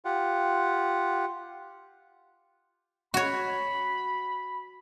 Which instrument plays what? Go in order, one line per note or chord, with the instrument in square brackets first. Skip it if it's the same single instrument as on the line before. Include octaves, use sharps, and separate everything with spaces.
[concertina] F4 G4 F#5
[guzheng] F#4 C#5 [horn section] B5